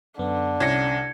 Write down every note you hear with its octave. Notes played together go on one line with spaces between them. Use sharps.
F#2 D3 B3
C2 C#4 G#6 A#6 C#7